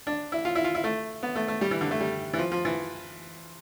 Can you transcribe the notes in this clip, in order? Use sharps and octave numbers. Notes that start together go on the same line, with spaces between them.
D4
E4
F4
E4
F4
E4
A3
B3
A3
A3
G3
E3
D3
A3
G3
E3
F3
F3
E3